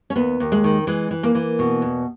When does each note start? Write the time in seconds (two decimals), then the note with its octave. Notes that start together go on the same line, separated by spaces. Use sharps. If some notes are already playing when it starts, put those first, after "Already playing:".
0.10 C#4
0.16 D#2 B3
0.40 D#2
0.52 G#3
0.64 D#3
0.87 E3 G#3
1.11 E3
1.23 A#3
1.35 E3
1.59 B2
1.82 E2